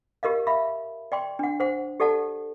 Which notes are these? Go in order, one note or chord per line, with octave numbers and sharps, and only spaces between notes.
G4 A#4 D#5 F5
E5 F5 B5
D5 G5 C6
D4 F#5
C5 F#5
G4 A4 D5 F#5 A5